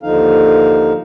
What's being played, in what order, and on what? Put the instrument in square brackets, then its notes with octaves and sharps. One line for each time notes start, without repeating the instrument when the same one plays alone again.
[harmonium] D#2 D3 F3 D#4 F5